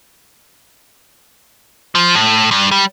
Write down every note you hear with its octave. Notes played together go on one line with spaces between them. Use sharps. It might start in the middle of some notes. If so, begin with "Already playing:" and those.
F3
A2
G2
G3